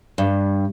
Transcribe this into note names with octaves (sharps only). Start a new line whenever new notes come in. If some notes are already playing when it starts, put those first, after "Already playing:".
G2